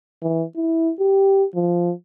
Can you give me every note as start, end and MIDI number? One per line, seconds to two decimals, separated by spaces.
0.22 0.44 52
0.56 0.92 64
1.00 1.45 67
1.55 1.92 53